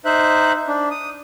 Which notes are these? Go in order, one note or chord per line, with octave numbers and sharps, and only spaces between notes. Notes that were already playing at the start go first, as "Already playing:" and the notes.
D#4 C5 E5 F#6
D4
D#6